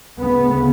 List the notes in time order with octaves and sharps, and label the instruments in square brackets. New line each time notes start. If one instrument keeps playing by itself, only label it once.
[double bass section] D2 C#3 B3